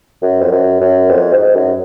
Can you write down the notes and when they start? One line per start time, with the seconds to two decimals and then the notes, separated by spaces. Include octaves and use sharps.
0.22 F#2
0.41 F2
0.51 F#2
0.80 F#2
1.10 F2
1.32 G#2
1.55 F#2